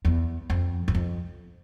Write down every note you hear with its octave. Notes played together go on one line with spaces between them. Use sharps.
E2
F2
E2
F2